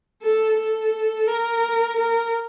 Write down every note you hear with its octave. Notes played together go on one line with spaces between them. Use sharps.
A4
A4
A#4
A#4